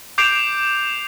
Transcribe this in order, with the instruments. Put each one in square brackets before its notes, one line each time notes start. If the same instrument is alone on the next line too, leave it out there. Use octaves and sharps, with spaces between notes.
[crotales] D6 G6 C7 D7 F7